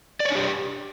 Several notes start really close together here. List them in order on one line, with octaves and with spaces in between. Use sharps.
D5 C#5 D4 G4